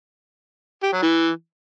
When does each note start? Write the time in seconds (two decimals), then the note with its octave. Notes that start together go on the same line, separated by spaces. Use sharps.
0.83 G4
0.93 F#3
1.03 E3